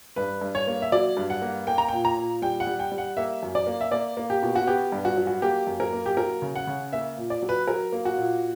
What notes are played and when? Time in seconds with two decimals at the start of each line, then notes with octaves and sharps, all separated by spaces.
0.16 G2 B4
0.41 G2
0.55 C#5
0.67 A#3
0.82 E5
0.92 F#3 D5
1.17 G2
1.30 F#5
1.42 A#3
1.67 A#3 G5
1.78 A#5
1.88 A#2 G5
2.05 A#5
2.17 A#2
2.42 G3 G5
2.60 F#5
2.67 G3
2.79 G5
2.92 G3
2.98 F#5
3.17 A#3 E5
3.43 F#2
3.55 D5
3.67 A#3
3.81 E5
3.92 A#3 D5
4.17 A#3
4.30 G4
4.43 B2
4.56 F#4
4.67 B3 G4
4.92 G2
5.05 F#4
5.17 F#3
5.27 F#4
5.42 A#3 G4
5.67 F#2
5.80 A#4
5.93 A#3
6.06 G4
6.17 F#3 A#4
6.42 C#3
6.55 F#5
6.67 C#3
6.93 A#3 E5
7.17 A#2
7.30 D5
7.42 F#3
7.49 B4
7.68 F#3 A#4
7.92 A#3
8.05 F#4
8.18 A#2